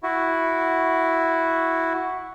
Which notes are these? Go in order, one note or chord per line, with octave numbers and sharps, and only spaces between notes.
E4 F#4